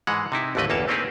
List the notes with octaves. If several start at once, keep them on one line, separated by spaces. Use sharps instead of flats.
G#2 E3 G#3 F#5
C3 D#4 E4
A1 D#2 D3 A3 B4 D#5
G1 E2 A#3 C#5 G5 A5
A3 A#3 C4 D#4 G4 G#4